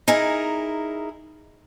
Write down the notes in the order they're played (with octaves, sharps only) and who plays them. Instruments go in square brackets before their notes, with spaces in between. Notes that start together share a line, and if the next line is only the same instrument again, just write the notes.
[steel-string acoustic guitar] D#4 E4 G#4 A#4